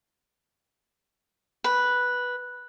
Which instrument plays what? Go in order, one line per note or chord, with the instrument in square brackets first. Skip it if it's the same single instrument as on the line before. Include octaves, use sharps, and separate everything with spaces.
[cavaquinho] B4